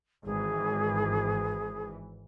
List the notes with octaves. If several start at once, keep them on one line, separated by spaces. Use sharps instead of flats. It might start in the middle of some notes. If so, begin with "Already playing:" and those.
G#1 E3 G#4